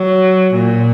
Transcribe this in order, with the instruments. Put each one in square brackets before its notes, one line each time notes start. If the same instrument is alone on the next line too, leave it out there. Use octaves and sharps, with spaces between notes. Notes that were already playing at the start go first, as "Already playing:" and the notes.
Already playing: [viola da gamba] F#3
A#2